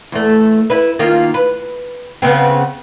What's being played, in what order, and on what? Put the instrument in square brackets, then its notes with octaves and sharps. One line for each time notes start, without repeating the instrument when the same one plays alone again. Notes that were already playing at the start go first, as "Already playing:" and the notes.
[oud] E2 A3
E4 B4
D#3 A#3 F4
B4
C#3 B3 C4